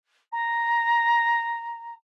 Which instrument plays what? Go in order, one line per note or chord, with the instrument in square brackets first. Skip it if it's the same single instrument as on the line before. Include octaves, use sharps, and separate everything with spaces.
[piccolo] A#5